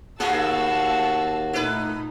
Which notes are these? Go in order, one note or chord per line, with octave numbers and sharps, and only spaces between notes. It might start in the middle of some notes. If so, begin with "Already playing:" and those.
D#2 A2 A#3 F#4 G#4 F5 A5 E6
A#2 A3 D#4 E4 B4